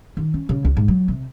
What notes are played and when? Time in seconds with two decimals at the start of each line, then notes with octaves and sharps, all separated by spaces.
0.17 D#3
0.34 C#4
0.49 C#3
0.65 C#2
0.77 G#2
0.88 F#3
1.08 C3